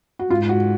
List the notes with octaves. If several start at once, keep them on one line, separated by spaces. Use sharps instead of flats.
F#4
G#2 F4
F#4